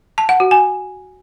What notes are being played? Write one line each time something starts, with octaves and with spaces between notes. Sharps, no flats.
A5
F#5
F#4
G#5